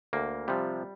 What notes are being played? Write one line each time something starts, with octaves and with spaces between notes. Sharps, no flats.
D2 A#3
C3 F3 G3